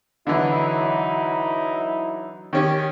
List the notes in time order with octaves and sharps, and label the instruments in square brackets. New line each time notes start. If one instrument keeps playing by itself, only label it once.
[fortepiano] D3 E3 [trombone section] F#3 D#4 E4
[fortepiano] D#3 C#4 G4